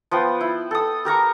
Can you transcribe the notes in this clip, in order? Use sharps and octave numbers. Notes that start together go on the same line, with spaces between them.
F3 B3 G5
E4
A4 D#6
G4 A#4 A#5 C#6